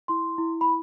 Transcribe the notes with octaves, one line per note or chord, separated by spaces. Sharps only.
E4 C6
E4
B5